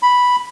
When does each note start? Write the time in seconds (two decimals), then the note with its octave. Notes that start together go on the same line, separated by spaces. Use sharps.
0.03 B5